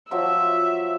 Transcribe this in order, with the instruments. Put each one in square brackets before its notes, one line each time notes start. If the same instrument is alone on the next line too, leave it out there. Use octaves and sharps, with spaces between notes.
[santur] F3 F#3 E6 [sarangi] E5